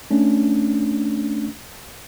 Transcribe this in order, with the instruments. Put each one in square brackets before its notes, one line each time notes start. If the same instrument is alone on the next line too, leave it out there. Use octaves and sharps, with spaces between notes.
[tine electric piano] A3 C#4 D4